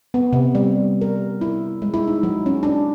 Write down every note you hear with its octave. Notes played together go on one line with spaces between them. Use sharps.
B3
C3
G3
A#4
E4
G#3
E4
D#4
F#3
C#4
D4